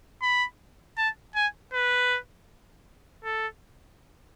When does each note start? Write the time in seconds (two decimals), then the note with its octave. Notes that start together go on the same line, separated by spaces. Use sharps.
0.22 B5
0.98 A5
1.36 G#5
1.73 B4
3.24 A4